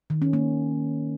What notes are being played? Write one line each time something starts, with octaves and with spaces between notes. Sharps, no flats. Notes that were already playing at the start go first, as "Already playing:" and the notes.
D#3
C#4
A#3